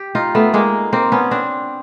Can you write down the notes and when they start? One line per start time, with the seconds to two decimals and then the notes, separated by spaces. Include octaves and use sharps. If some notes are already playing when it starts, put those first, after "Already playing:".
Already playing: G4
0.15 D#4 F4
0.35 A3 B3
0.54 G#3 A#3
0.93 A#3 C4
1.12 B3 C#4
1.31 C4 D4